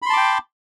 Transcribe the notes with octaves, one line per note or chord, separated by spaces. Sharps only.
G5 A5 B5 C6 D6